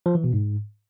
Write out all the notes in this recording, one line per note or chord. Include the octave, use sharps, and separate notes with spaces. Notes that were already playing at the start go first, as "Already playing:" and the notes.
F3
E3
B2
G#2